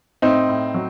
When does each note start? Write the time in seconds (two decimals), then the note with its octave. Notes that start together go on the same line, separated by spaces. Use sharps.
0.22 A2 C4 D#4
0.49 A2
0.74 F#3